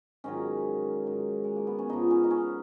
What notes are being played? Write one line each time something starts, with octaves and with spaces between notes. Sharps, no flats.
G#2 D#3 F#3 C#4
G#2 F#3
G#3
A#3
B3
C#4
G#2 F3 D#4
C#4
D#4
C#4